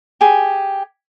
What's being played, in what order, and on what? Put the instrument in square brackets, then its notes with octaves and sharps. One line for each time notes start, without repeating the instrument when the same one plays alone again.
[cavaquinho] G4 G#4